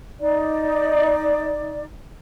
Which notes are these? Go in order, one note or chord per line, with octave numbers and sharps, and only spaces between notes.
D#4 D5